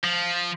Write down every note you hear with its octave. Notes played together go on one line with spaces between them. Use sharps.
F3